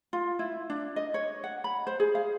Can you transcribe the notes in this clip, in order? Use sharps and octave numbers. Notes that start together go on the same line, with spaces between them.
F4
E4
D4
D#5
C#5
F#5
B5
C5
G#4
F5